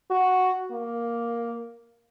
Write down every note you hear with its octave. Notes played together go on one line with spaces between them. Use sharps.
F#4
A#3